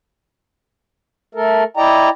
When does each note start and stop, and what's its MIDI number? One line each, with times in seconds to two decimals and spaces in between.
1.35 1.64 57
1.35 1.64 69
1.35 1.64 70
1.77 2.09 64
1.77 2.09 74
1.77 2.09 75
1.77 2.09 79
1.77 2.09 82